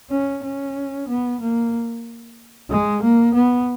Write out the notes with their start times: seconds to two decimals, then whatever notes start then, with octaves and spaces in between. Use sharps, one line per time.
0.10 C#4
0.44 C#4
1.08 B3
1.40 A#3
2.70 G#3
3.02 A#3
3.34 B3